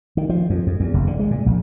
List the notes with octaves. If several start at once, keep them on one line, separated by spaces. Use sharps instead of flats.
D#3
F3
F2
F2
E2
F#1
D3
G#3
A#2
A#1